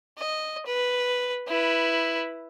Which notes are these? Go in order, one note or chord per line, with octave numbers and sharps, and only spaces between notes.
D#5
B4
E4 B4